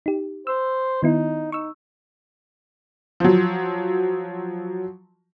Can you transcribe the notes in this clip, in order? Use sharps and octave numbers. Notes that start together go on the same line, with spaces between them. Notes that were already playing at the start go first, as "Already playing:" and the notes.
D#4 G4
C5 E6
D#3 B3 D#4 E4
D#4 C#6 E6
F3 F#3